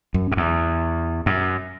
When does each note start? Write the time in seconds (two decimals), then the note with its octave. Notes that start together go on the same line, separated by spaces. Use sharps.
0.14 F#2
0.32 F#2
0.37 E2
1.26 F#2